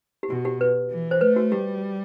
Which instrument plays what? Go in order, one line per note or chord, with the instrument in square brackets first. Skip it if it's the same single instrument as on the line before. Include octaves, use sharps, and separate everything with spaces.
[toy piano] G4
[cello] B2 [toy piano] F#4
[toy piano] G4
B4
[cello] E3
[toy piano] C5
[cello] A3 [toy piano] B4
[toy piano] F#4
[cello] G3 [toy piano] G4